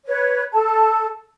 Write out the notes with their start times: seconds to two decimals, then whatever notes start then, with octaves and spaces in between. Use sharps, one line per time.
0.06 B4 C#5
0.52 A4 A5